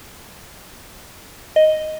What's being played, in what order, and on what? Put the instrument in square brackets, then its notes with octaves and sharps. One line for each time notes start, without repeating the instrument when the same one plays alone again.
[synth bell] D#5